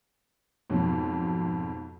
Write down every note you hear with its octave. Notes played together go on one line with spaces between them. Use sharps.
F2 G#2 B2 F#3